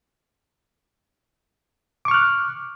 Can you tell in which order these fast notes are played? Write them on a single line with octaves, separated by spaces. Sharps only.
D6 C#6 F6 F#6